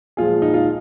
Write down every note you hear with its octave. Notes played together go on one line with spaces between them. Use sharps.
A#2 F3 G#3 F4 G#4
D#4
F4